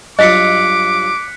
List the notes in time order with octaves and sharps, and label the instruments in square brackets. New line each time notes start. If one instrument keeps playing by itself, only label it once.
[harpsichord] G2 F#3 F4 [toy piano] D#5 [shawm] D6 [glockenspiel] F#6 B6 C#7